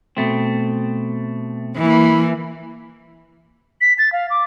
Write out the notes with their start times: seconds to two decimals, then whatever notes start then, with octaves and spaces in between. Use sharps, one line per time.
0.17 B2 A3 C4
1.77 E3 A#3
3.81 B6
3.98 A6
4.12 F5
4.30 D6